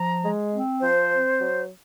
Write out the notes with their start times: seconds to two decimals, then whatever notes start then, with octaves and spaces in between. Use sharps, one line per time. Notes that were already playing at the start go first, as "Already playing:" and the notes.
Already playing: F3 A#5
0.24 G#3
0.53 C4
0.81 F3 C5
1.10 C4
1.40 F#3